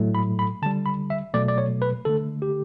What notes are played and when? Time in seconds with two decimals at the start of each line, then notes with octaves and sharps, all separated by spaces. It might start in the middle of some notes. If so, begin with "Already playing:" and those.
Already playing: A2 F#3 A3
0.15 B5
0.39 B5
0.62 D3 A5
0.66 G3
0.86 B5
1.10 E5
1.34 B2 F#3 A3 D5
1.48 D5
1.58 C#5
1.82 B4
2.05 D3 A3 A4
2.42 G4